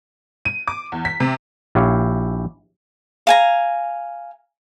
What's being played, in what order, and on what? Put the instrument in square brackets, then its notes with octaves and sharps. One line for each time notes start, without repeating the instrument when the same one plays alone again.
[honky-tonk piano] D#7
D6
E2
B6
C3
[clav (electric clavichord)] A#1 E4 G4 C#5 F5 G5
[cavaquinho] F5 G#5 A#5